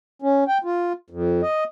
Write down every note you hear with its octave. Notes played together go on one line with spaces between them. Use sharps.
C#4
G5
F4
F2
D#5